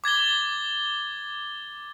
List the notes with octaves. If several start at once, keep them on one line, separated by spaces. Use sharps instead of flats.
D6 G#6 A6 G7